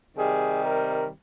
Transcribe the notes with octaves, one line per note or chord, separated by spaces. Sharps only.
C3 D#3 G3 G#4
A#4